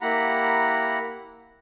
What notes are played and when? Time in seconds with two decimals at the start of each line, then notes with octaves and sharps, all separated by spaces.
0.01 A#3 E4 G4 F#5 A#5 B5